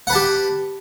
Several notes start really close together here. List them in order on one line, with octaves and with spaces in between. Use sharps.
F#5 B4 A5 G4